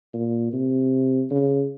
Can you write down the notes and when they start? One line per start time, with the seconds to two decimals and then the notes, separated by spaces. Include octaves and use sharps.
0.14 A#2
0.53 C3
1.31 C#3